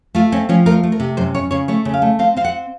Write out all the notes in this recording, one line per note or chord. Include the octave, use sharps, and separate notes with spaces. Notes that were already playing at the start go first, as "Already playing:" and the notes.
A3 F4
C4 C#4
F3 C#4
A3 A#4
A3
A#4
C3
F#2 C5
C#4 C#5
C#3 C#5
A3 C#5
C#3
F5
A3
C4 F5
C4 F5
F#5